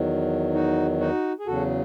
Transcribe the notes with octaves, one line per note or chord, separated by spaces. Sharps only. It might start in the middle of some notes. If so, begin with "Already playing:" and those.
Already playing: E2 D#3 F#3
D#4 F#4
D#4 F#4
G#4
E2 C#3 F#3 F#4 A4